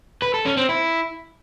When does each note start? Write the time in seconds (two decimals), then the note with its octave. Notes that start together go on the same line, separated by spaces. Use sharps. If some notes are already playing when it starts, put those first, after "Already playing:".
0.22 B4
0.34 A4
0.46 C#4
0.57 C4
0.69 E4